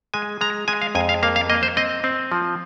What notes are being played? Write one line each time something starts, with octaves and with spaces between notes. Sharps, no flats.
G#3 G#5
G#3 A#5
G#3 G#5
F5
F2 G#5
F5
A#3 F5
F5
A#3 D#5
C5
C4 D#5
C4
F3